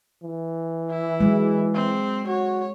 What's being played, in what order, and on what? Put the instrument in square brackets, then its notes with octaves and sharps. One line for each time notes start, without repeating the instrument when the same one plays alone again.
[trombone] E3
[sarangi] E4
[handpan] F#3 G#3
[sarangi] C4
[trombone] F#4 [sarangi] C#5